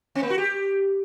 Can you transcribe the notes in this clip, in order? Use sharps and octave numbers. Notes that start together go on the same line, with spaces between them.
C4
A#3
F#4
G4